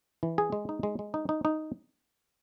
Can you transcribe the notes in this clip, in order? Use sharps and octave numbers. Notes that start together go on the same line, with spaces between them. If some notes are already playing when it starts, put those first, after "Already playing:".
E3
G#4
G#3
D#4
G#3
G#3
D#4
D#4
D#4